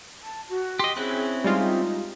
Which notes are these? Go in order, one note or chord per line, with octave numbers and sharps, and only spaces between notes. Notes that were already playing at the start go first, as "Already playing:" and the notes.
A5
F#4
G4 D#5 C6
C4 C#4 E4 G#4 F#6
G3 G#3 D#4 F4